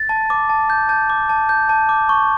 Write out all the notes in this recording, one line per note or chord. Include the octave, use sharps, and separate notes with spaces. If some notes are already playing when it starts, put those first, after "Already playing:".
Already playing: A6
A5
D6
A5
G6
A5 G6
D6
A5
G6
A5
D6
C#6